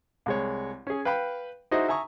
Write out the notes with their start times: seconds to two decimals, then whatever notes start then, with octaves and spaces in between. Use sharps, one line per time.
0.26 C2 G#3 C#5
0.87 C#4 G#4
1.05 B4 F5 G5 B5
1.71 D#4 E4 F#4 G#4 C5 D#5
1.88 E5 G#5 A#5 C#6 D#6